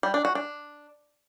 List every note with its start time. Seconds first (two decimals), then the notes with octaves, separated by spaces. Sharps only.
0.03 G3
0.14 D4
0.25 F#4
0.35 D4